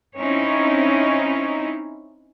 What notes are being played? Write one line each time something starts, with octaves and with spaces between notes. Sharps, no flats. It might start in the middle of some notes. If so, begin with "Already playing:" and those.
C4 C#4 D#4 E4 C#5